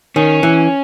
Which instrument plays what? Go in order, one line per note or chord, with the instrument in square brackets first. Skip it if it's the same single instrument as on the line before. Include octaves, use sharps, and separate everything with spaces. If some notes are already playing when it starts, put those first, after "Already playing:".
[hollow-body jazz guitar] D#3 [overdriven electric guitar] C#4
[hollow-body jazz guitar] E3